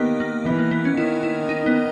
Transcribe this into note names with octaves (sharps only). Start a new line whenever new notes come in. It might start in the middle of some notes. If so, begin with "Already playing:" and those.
Already playing: D#3 A#3 B3 G4
A#3
E3 B3
A#3
B3
C#4
D#3 E4
E4
D#4
B3